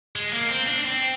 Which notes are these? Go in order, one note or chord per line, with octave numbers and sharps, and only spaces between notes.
G#3
A#3
C4
D4
C4